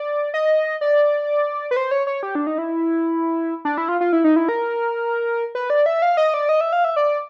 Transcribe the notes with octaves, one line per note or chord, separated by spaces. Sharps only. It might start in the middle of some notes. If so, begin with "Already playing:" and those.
Already playing: D5
D#5
D5
B4
C5
C#5
C#5
G4
D4
D#4
E4
D4
E4
F4
F4
E4
D#4
E4
A#4
B4
D5
E5
F5
D#5
D5
D#5
E5
F5
E5
D5